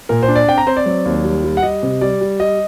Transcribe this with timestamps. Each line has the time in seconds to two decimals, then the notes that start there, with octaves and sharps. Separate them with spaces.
0.09 A#2 A#4
0.23 C5
0.28 D4
0.36 D5
0.48 C4 G5
0.58 A#5
0.67 C4 C5
0.77 D5
0.86 F#3
1.05 D#2
1.24 G3
1.44 G3
1.57 F#5
1.63 G3 D#5
1.83 C3
2.01 G3 D5
2.21 G3
2.40 G3 D#5